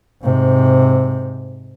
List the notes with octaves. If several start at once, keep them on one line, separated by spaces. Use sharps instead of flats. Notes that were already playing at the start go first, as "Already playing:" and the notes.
G#2 C3